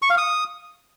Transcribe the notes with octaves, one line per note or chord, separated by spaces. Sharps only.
C#6
F5
D#6